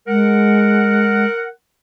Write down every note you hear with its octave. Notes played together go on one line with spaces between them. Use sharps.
G#3 A#4 F#5